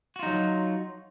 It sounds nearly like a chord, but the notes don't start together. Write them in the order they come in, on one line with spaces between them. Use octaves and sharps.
F#4 F4 D#4 F#3